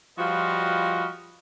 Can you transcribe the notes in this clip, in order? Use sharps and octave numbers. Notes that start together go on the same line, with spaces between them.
F3 G3 F4 F#4 B4 D#5